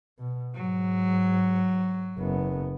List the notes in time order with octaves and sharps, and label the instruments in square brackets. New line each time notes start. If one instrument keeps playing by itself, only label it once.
[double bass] B2
[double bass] G#2 [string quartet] F#3
[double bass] F#1 B3